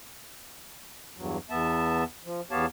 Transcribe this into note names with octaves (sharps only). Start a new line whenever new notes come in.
E2 G2 F#3
E2 B3 E5 A5
F3
E2 B3 G4 C#5 F5 A5